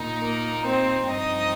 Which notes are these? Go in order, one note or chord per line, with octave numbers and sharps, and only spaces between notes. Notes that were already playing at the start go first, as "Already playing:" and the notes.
Already playing: A#2 D#4
A#3 A#4
C4 C5
G2 F3 C4 D#4 D#5